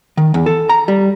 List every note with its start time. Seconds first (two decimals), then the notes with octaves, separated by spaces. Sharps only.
0.17 D#3
0.34 E2
0.46 A4
0.69 A#5
0.88 G3